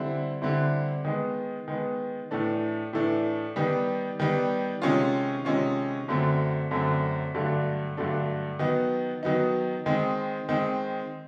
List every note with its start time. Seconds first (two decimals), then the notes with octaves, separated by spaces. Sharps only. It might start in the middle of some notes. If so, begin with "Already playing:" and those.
Already playing: D3 G3 C4 E4
0.42 D3 G3 C4 E4
1.05 D#3 G#3 B3
1.68 D#3 G#3 B3
2.31 A2 E3 A3 D4
2.93 A2 E3 A3 D4
3.56 D#3 G3 B3
4.20 D#3 G3 B3
4.82 C3 D#3 G#3 C#4 F4
5.45 C3 D#3 G#3 C#4 F4
6.08 F#2 D3 F#3 A3 C4
6.71 F#2 D3 F#3 A3 C4
7.34 G2 D3 F#3 A3 D4
7.97 G2 D3 F#3 A3 D4
8.59 D#3 F#3 B3 D#4
9.23 D#3 F#3 B3 D#4
9.86 D#3 G#3 C4
10.49 D#3 G#3 C4